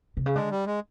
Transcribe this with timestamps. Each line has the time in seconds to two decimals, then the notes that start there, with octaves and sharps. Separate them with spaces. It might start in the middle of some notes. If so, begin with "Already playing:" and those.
0.17 C3
0.26 C#3
0.36 D3 G#3
0.51 G3
0.66 G#3